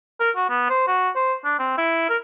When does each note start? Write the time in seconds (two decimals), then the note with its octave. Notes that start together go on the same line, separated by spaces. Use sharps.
0.20 A#4
0.36 F#4
0.49 B3
0.70 C5
0.88 F#4
1.16 C5
1.45 D4
1.59 C4
1.78 E4
2.10 A#4